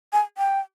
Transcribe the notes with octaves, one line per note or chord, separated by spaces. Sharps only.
G#5
G5